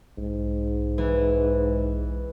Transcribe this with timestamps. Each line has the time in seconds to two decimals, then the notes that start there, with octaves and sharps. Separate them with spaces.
0.18 B1 G#2
0.98 E3